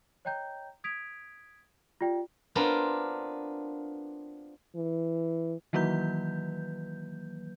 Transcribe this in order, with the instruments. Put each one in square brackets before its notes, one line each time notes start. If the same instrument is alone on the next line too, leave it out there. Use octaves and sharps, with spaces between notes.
[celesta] C#5 D#5 G5 A#5 G6
D#6 G#6 B6 D7 F7
F4 G4 D5 G5
[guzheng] B3 C4 D4 F4 A#4
[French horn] E3
[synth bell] D#3 E3 F#3 A#3 B4 G6